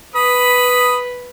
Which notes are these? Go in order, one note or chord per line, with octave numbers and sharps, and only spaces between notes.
B4 B5 D#6